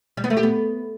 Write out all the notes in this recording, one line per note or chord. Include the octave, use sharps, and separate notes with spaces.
G3
B3
A3
G4
B3